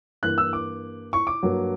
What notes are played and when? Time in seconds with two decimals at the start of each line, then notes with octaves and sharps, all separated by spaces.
0.23 G2 E3 A#3 F#6
0.38 E6
0.53 D6
1.13 C#6
1.27 D6
1.43 G2 F#3 A#3